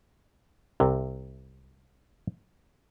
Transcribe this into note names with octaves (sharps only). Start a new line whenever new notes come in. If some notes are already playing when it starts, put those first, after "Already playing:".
C2 C3